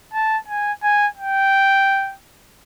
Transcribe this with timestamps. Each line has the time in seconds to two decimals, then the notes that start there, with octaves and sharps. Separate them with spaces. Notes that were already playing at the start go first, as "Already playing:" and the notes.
0.13 A5
0.48 G#5
0.83 G#5
1.17 G5